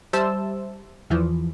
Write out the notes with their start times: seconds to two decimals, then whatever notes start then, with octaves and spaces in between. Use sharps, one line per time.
0.13 G3 C5 E5 A5 E6
1.10 E2 E3 F3